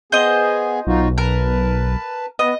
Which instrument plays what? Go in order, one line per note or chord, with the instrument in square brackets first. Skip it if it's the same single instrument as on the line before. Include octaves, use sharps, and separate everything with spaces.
[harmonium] B3 G#4 G#5 [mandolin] C5 D#5
[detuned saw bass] B1 [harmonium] D#4 F4 F#4
[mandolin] A#4 [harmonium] B4 A5
[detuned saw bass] B3 [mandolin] D#5